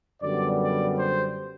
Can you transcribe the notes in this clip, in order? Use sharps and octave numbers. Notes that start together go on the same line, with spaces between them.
F#2 D3 G3 B3 D5
D5
C5